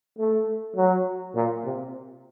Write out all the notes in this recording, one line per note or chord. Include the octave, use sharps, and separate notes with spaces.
A3
F#3
A#2
C3